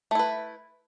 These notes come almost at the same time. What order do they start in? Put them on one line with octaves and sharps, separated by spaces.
A3 E4 B4